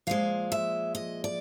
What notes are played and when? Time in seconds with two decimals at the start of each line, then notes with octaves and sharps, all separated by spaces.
0.07 A#2 F3 G#3 F5
0.52 E5
0.95 D#5
1.24 D5